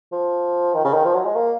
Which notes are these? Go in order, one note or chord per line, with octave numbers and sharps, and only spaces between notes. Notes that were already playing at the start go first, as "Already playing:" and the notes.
F3
D#3
C#3
D#3
F3
F#3
G#3
A#3